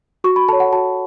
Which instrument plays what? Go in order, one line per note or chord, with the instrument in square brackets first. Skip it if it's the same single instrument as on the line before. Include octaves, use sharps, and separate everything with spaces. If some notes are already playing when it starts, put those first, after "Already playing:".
[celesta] F#4 C#6
B5
A4 A5
C#5
F#5
F#4 A5